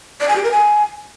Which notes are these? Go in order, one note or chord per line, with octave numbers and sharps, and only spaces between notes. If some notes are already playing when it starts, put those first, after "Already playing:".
D5
G#5
G4
A#4
G#5